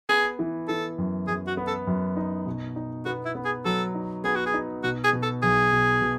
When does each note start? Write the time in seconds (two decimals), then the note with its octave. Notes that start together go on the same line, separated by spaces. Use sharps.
0.09 B3 G#4
0.39 E3
0.68 E3 A4
0.98 F#2
1.28 F#2 G#4
1.47 F#4
1.57 B3
1.67 A4
1.87 F#2
2.16 D#4
2.46 B2
2.76 D#4
3.05 B3 F#4
3.26 E4
3.35 B3
3.45 G#4
3.65 F#3 A4
3.95 D#4
4.24 B3 G#4
4.35 F#4
4.46 G#4
4.54 D#4
4.83 B2 F#4
5.04 G#4
5.13 B2
5.23 A4
5.43 B1 G#4
5.72 B2
6.02 B2